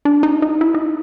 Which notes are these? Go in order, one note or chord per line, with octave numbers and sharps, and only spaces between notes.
D4
D#4
D#4
E4
D#4